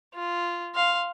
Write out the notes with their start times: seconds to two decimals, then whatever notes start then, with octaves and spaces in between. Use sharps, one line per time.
0.14 F4
0.74 F5 C6